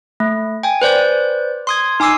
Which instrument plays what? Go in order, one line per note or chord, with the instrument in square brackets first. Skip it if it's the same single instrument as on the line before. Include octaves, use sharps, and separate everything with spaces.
[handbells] A3
G5 G#5
B4 C5 D5 G6
C6 D#6 G#6
D#4 G#5 D6 E6 C7